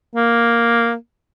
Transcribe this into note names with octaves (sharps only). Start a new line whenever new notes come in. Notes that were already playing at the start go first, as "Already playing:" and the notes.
A#3